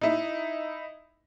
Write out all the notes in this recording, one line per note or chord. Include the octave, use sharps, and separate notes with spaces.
D#4 E4